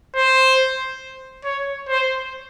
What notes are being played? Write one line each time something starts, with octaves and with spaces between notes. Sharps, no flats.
C5
C#5
C5